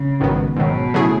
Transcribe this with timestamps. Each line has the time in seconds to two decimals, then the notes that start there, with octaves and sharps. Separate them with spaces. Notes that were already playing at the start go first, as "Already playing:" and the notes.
Already playing: C#3
0.20 A1 G#2 D#3 F#3 B3
0.56 G#2 B2 D#3 F#3
0.94 C#3 F#3 A3 E4 G#4